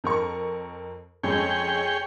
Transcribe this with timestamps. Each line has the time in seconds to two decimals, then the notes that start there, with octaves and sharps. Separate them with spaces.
0.04 F2 A#4 C#6
1.23 F2 G#3 C#4 G#4 C#5 G5